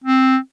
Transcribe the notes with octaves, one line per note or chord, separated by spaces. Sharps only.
C4